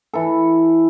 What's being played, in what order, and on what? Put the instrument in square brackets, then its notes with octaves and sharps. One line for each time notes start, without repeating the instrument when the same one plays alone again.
[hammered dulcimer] E3 A4